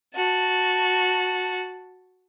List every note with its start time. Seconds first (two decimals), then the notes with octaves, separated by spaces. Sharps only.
0.15 F#4 A5